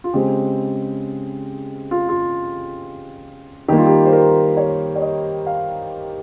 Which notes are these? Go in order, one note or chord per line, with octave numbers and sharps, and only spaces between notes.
F4
C#3 G#3 C4 G4
F4
F4
D#3 G3 A#3 G4
F4
G4
C5
A#4
C#5
C#5
D#5
F5